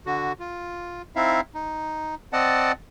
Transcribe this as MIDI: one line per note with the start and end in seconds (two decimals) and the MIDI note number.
0.06 0.33 50
0.06 0.33 66
0.40 1.02 65
1.16 1.41 60
1.16 1.41 63
1.16 1.41 64
1.16 1.41 76
1.16 1.41 77
1.55 2.15 63
2.33 2.72 60
2.33 2.72 74
2.33 2.72 75
2.33 2.72 78
2.33 2.72 81